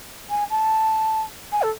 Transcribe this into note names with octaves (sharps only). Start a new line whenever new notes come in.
G#5
A5
G#5
A4